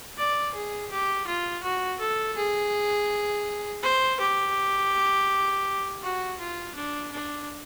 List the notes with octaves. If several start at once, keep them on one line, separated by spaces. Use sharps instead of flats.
D5
G#4
G4
F4
F#4
A4
G#4
C5
G4
F#4
F4
D4
D4